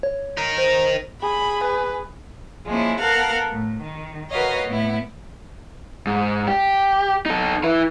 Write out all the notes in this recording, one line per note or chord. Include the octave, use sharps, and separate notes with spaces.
C#5
D#4 A#4
C5
G#4 B5
B4
F3 G#3 A#3 C#4 E4
B3 A4 A#4 F5 F#5
A2
D#3
F#4 A#4 B4 C#5 D#5 F5
A2 B3 E4
G#2
G4
D#4 A4
E4 B4